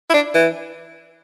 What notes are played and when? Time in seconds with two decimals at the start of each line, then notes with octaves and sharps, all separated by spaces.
0.10 E4
0.14 D4
0.35 E3